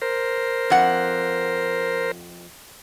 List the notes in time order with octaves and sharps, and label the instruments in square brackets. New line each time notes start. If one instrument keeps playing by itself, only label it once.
[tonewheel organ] A#4 C5
[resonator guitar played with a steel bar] F2 F#5